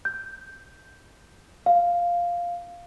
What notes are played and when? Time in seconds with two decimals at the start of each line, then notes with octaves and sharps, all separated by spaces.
0.05 G6
1.66 F5